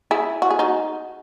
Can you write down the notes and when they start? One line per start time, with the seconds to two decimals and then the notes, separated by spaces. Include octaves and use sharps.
0.11 E4 G#4
0.42 F#4
0.50 G#4
0.59 D#4 F#4